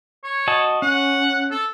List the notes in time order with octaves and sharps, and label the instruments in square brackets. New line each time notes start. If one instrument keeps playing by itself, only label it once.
[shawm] C#5
[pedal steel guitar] F#4 D#5 A5
[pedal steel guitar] C#4 [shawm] F#5
[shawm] A4